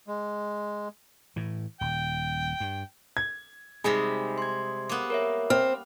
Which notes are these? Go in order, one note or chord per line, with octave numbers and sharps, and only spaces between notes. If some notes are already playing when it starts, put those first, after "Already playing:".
G#3
A2 E3
D#1 G5
G2
G#6
C3 G3 G#3 D#4 G#4 B5
C6 G#6
A#3 B3
A#4 C#5 E5
C4 F6